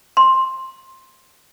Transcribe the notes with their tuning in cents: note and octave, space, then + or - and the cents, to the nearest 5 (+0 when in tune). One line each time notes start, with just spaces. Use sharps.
C6 +10